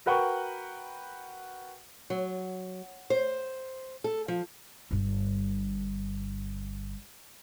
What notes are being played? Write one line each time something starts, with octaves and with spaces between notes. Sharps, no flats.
F#4 A#4 B4 F#5 G5 C#6
F#3
C5
A4
F3
G1 G2